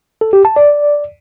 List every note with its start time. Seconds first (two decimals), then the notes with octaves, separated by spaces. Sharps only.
0.21 A4
0.33 G4
0.45 A5
0.56 D5